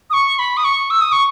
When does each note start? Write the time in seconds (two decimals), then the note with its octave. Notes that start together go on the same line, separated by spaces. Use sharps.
0.10 D#6
0.13 C#6
0.39 B5
0.57 D#6
0.64 C#6
0.90 E6
1.01 D#6
1.12 C#6